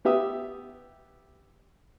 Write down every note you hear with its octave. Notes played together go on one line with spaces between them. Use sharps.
B3 G4 E5 D#6